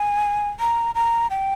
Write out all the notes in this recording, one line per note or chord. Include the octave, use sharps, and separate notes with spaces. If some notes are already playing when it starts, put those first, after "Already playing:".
Already playing: G#5
A#5
A#5
G5